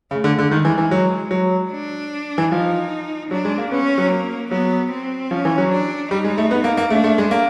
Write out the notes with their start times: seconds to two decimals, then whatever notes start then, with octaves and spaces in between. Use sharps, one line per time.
0.11 C#3 A3
0.24 D3
0.39 D3
0.51 D#3 G#3
0.65 E3
0.78 E3
0.91 F#3
1.31 F#3
1.71 D4
2.38 E3
2.51 F3 D#4
3.31 F#3 D4
3.45 G#3
3.58 A#3
3.72 B3 C#4
3.98 F#3
4.11 A#3
4.51 F#3 B3
4.91 C4
5.31 F3 C#4
5.45 E3
5.58 F#3
5.71 D4
6.11 G3 D#4
6.24 G#3
6.38 A3
6.51 B3
6.64 A#3
6.77 A#3
6.90 A3 D4
7.04 A3
7.18 G#3
7.31 A#3